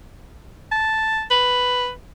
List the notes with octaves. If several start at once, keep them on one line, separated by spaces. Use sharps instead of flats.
A5
B4